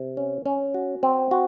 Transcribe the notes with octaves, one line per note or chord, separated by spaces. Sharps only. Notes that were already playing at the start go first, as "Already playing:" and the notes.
Already playing: C3
C#4
C#4
F#4
C4
F#4